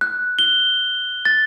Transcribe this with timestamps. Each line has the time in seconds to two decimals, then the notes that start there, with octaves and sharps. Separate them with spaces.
0.01 F#6
0.39 G7
1.25 A6